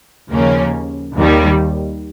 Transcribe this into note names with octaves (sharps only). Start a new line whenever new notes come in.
D#2 C#3 F3 A#3 C#4
D#2 D#3 G3